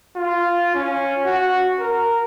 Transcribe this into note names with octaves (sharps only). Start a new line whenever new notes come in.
F4
C#4
F#4
A#4